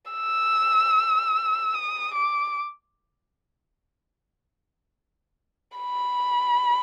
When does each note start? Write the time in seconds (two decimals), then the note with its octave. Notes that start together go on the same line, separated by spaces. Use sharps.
0.12 E6
1.74 D#6
2.14 D6
5.78 B5